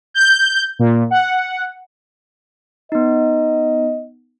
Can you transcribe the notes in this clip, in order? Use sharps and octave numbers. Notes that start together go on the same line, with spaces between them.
G6
A#2
F#5
B3 D#4 D#5